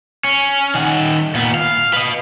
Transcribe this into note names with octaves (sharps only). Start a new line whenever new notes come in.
C#4
D#3 F#5
A#2 B3
F5
B4 D#5